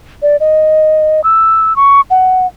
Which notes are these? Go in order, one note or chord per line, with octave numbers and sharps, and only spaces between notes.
D5
D#5
E6
C#6
F#5